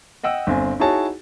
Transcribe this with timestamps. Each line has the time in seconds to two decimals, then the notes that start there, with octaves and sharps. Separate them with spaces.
0.24 D#5 F#5 G5 E6
0.47 G1 C4 G#5
0.80 D#4 E4 F#4 G#4 C#5 A5